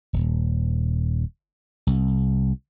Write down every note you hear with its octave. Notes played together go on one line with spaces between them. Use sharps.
D#1
C2